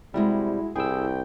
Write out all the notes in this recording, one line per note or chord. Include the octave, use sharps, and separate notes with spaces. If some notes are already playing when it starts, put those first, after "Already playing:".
C3 G3 G#3 E4 F#4 E5
C2 E4 G#4 G5 E6